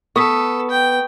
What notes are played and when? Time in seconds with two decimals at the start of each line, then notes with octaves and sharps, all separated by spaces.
0.16 B3 A4 C#6 D#6 B6
0.70 G5